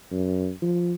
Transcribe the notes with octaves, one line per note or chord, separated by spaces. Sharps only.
F#2
F3